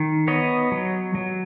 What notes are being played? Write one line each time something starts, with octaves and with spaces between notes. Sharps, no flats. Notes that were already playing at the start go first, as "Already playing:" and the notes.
Already playing: D#3
B3 C#5 D#5
F#3
F#3